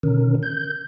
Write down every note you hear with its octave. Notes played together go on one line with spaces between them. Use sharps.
B2 D3 D#3 C#4 A#4
G6